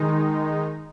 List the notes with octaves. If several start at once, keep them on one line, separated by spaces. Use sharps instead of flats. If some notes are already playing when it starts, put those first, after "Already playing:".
Already playing: D#3 G#3 D#4